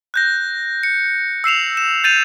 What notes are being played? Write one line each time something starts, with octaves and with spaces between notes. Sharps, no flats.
F#6 G6 A#6
C#7
E6 C7 E7 F7
E7
G6 A6 D#7 F7